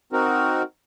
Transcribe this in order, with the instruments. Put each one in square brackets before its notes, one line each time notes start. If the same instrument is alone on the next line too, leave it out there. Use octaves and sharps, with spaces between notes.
[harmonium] C4 D#4 F#4 A#4